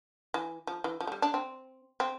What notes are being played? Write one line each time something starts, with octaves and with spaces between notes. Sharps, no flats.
E3
F3
E3
F3
A3
G3
D4
C4
C4